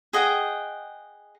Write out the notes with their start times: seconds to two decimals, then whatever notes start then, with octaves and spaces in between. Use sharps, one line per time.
0.13 G#4 D#5 F#5 G5